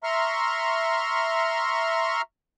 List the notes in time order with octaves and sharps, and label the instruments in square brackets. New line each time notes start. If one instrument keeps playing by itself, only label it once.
[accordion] E5 A#5 C6 C#6 F6